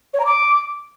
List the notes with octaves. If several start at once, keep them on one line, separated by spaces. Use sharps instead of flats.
C#5
A#5
D6